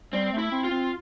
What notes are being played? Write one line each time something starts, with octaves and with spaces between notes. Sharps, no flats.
G3 C4
A3
E4
C4
F4
C4